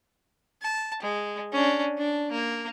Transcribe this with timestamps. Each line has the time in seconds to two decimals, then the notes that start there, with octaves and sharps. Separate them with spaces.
0.62 A5
1.02 G#3
1.52 C#4 D4
1.98 D4
2.32 A#3